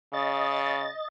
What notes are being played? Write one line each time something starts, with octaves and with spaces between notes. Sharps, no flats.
C#3 D#5 A6